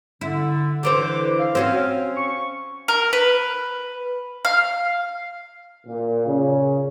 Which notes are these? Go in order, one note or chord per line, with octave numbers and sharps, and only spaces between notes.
D3 E4
D3 E3 C5 D6
F5
C4 C#4 F#4
C#6
A#4
B4
F5
A#2
C#3